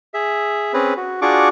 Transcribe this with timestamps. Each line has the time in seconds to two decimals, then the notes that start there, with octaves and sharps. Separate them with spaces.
0.14 G#4 E5
0.74 C4 C#4 G#4 B4
0.97 F#4
1.22 D4 F4 F#4 G#4 C#6 D6